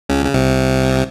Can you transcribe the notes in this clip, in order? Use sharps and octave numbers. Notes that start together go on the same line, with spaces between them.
C#2 C#3
C#3
C2 C3